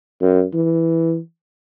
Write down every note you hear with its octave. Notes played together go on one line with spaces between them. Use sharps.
F#2
E3